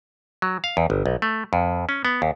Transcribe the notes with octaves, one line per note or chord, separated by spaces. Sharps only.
F#3
F5
E2
G1
B1
A3
F2
C#4
B3
D#2